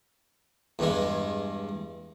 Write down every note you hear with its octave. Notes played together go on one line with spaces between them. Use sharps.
E2 G2 G#3